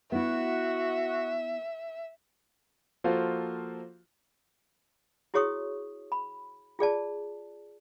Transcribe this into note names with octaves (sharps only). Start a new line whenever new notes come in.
B3 E4 F#4 E5
F3 A#3 F4 F#4 A4 C5
E4 F#4 G#4 C#5 C#6 D#6
B5
F4 G#4 D5 A5